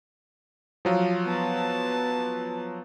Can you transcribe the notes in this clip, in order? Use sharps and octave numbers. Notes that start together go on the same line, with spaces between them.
F3 F#3 F4
B3 A5